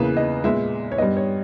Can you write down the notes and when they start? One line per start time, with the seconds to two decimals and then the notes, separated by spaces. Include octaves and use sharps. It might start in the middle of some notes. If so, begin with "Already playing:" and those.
Already playing: E2 C#3 E3 A#3 B4
0.17 D#5
0.44 A#2 G#3 B3 E5
0.92 C#5
0.98 G2 G3 B3 D#5
1.17 C#5